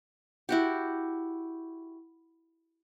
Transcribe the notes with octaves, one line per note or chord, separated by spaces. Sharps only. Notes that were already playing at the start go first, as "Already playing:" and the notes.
E4 F#4 G4